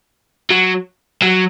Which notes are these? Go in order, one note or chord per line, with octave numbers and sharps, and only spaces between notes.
F#3
F#3